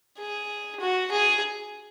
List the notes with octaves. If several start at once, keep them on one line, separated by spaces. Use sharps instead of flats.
G#4
F#4
G#4